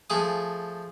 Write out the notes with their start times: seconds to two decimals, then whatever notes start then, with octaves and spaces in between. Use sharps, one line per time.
0.10 F3 A3 G#4 D#6